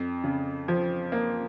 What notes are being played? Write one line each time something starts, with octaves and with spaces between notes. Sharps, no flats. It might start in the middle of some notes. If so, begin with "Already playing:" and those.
Already playing: F2
C#3
F3
A#3